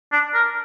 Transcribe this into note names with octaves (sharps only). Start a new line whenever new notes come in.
D4
A#4